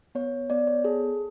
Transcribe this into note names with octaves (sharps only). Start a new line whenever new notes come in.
B3 C#5
B3 D5
C#5
G#4 A4